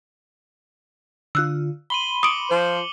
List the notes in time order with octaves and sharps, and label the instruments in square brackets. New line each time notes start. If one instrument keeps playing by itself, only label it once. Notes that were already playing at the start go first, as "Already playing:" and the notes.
[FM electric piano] D3 F4 [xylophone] E6 F#6
[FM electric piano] B5 C6 [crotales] D#7 F#7 G7
[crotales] D6 C#7 F#7 [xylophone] D#6 D7
[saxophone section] F3 C5